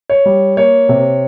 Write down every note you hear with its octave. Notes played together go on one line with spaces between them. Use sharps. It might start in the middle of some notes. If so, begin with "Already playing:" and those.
C#5
G3
A#3 C#5
C3